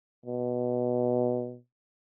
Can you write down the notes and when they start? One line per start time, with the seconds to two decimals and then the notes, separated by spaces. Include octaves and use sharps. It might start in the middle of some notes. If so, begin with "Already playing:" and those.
0.26 B2